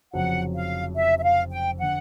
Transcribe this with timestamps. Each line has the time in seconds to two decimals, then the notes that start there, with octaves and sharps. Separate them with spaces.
0.13 F1 F2 C#3 F#3 F#5
0.55 F5
0.95 E5
1.19 E5
1.23 F5
1.51 G5
1.78 D3 F#5